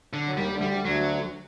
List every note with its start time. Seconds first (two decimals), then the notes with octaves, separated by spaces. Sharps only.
0.13 D3
0.27 F#3
0.37 D#2 D#3 G3
0.53 D2 D3
0.61 G3
0.69 D2 D3
0.85 D2 D3 F#3